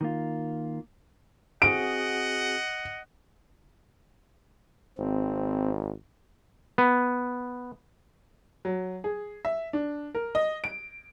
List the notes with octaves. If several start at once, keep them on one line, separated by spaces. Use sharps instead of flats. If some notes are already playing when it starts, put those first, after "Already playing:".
D#3 A#3 F4
C4 F#4 G#4 D#5 F#5 D7
G#1 C4
B3
F#3
G#4
E5
D4
A#4
D#5
D7